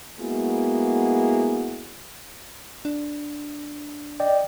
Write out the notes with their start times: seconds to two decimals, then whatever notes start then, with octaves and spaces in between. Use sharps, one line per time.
0.20 G#3 A#3 B3 E4 F#4 G#4
2.85 D4
4.20 D5 D#5 G5